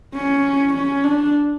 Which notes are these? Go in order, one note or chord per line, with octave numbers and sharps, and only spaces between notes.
C#4
C#4
D4